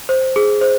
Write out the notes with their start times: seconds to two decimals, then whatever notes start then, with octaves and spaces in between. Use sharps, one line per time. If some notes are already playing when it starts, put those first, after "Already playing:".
0.09 C5
0.36 G#4
0.61 C5